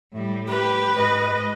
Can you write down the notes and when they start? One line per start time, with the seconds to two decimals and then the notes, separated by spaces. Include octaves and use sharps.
0.13 A2 G3
0.49 G4 B4
0.96 G#2 D#5